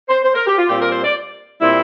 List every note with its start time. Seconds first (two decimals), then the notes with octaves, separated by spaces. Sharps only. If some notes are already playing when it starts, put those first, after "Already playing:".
0.08 C5
0.24 C5
0.35 A#4
0.47 G4
0.58 F4
0.69 A#2 G3 C4 F4 G4
0.80 A#4
0.92 C5
1.04 D5
1.60 A#2 G3 C4 E4